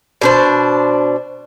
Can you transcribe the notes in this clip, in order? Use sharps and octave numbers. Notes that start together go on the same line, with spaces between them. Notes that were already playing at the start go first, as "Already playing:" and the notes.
B2 D4 C5